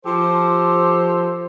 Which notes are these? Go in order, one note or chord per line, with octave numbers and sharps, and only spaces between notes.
F3 G4 A4 C5